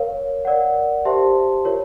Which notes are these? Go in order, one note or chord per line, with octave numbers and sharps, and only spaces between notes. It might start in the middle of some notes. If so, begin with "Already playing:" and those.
Already playing: A#4 C#5 F5
A#4 D5 F#5
G4 C5 E5 A5 C6
F4 A#4 C#5